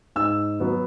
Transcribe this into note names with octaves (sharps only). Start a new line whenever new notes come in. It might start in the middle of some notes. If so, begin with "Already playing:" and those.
G#2 E6
F#3 B3